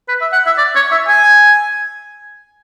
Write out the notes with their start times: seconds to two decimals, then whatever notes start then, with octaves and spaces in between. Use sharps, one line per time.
0.08 B4
0.21 E5
0.33 F#5
0.46 E5
0.58 D5
0.75 C#5
0.92 E5
1.08 G#5